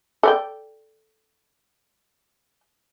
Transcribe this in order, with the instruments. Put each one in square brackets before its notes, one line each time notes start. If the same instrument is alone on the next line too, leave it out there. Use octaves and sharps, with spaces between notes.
[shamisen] A4 D5 G5